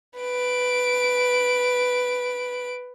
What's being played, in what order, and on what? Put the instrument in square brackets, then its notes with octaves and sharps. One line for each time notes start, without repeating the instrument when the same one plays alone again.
[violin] B4 D7